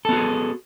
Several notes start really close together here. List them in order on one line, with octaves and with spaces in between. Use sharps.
A4 B3 F#4 G#4